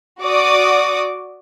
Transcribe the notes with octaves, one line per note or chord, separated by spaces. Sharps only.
F#4 D5 D6 D#6